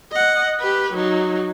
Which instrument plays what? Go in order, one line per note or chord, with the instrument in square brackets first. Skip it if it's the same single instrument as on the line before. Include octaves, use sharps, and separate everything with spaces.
[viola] D#5 F#5
G4 B4
F#3 D#4